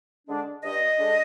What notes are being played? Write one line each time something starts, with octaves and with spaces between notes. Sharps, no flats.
D3 G#3 D4
G2 D#5
D3 G#3 D4